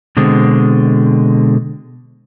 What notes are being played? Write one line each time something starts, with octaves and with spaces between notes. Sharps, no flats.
B2 D3 G#3 C4